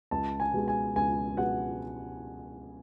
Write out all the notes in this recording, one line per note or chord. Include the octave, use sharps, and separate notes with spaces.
C#2 A5
G#5
B2 G#3
G#5
C#2 G#5
B2 G#3 F#5